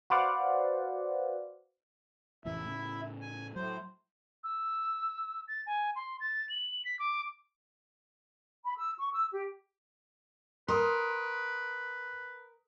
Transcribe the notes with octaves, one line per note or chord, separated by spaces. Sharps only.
F#4 B4 C5 D5 F5 F#5
F1 A2 E3 E4 E5
A2 C#3
G#5
A2 F#3 C5
E6
A6
G#5
C6
A6
F#7
B6
D6
B5
E6
C#6
E6
G4
A#4 B4 C6 D#6